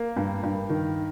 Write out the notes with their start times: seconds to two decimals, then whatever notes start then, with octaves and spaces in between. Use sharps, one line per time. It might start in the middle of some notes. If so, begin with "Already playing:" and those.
Already playing: A#3
0.16 G2
0.43 G2
0.70 D#3